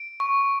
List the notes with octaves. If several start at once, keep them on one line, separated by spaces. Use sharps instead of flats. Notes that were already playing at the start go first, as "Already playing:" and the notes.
Already playing: D7
C#6